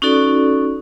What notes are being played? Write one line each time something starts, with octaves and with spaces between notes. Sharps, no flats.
C#4 D#4 F#4 A4 D5